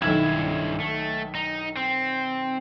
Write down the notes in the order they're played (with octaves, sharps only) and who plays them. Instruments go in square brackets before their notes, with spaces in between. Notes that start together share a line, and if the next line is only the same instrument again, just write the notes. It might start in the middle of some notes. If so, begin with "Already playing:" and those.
[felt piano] B1 D#3 G#6 [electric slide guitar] G2 E4 E5
[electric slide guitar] A3
D#4
C4